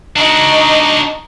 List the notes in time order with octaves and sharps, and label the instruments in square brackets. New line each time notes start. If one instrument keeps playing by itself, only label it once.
[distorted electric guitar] D4 F#4 [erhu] D#4